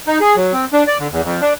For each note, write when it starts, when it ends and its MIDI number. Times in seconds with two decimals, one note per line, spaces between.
0.07 0.18 63
0.21 0.36 68
0.36 0.53 54
0.53 0.65 60
0.73 0.83 62
0.87 0.98 74
0.99 1.08 50
1.12 1.21 40
1.24 1.41 41
1.41 1.53 62